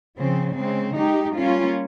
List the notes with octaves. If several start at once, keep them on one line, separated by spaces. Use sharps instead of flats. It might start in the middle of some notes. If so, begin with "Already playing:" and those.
C#3 F3 C4
C#3 G#3 C4
G#3 D#4 G4
G3 A#3 C#4 F4